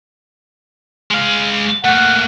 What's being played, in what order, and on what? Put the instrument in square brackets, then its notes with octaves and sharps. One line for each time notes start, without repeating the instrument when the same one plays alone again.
[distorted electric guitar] G#3 F5
[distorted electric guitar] A3 A#3 [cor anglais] F#5